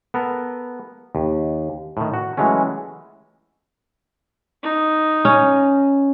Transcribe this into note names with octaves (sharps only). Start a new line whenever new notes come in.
B3 A4 A#4
D#2
A2 D#3
F#4
E3 F#3 G#3 A3 C#4
D#4
C#4